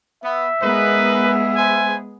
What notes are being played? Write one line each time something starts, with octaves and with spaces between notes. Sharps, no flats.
B3 E5
G#3 B3 D#4 G#4 A#4 B4
B4 C5 G#5